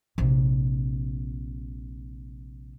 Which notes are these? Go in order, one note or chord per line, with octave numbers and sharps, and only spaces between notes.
A#1 C3